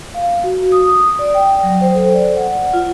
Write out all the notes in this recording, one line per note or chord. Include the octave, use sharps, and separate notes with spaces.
F5
F#4
D#6
D5
G5
F#3
C5
A4
D5
F#5
F4